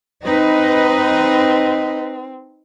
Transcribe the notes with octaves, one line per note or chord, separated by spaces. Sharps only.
C4 D#4 B4 D#5